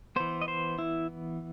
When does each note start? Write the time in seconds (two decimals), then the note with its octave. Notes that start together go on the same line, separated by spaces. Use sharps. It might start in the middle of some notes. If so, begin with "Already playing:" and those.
0.16 E3 B3 C5
0.42 D#5
0.48 C5
0.79 E4